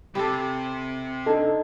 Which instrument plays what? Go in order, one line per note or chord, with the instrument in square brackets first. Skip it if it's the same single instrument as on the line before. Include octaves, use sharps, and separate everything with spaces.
[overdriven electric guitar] C3 [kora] G4 A4 [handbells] B5
[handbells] D4 D#4 D#5 [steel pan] A4